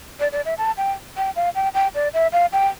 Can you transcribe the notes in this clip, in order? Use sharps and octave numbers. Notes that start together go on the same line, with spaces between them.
D5
D5
E5
A5
G5
G5
F5
G5
G5
D5
E5
F5
G5